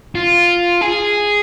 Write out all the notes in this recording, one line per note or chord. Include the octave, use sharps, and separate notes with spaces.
F4
G#4